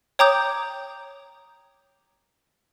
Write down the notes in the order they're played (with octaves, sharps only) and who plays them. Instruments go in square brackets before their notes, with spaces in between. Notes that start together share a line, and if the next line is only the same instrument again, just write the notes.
[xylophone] C#5 G5 A#5 D6 D#6 G6